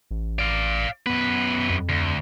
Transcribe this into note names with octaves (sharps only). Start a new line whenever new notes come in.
A1
D5 F5
F#2 B3 B4
F2
D2